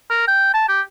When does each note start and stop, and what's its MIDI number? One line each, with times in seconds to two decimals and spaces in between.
0.10 0.26 70
0.28 0.50 79
0.54 0.64 81
0.69 0.81 67